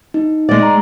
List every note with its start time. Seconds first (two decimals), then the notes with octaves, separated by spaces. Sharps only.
0.14 D#4
0.49 G#3 D5
0.63 A#5